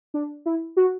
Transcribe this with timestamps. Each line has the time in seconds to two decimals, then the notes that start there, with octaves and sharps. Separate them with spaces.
0.14 D4
0.46 E4
0.77 F#4